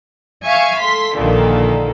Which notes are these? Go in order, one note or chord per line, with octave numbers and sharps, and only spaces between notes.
E5 F5 G#5 C#6
A4 C6 B6
A#1 A#2 D3 D#3 A4